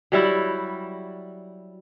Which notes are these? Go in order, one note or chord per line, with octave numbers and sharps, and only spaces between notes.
F#3 G3 E4 F#4